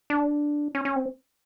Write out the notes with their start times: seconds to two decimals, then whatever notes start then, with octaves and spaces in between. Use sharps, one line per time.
0.10 D4
0.75 C#4
0.85 C#4
0.96 C4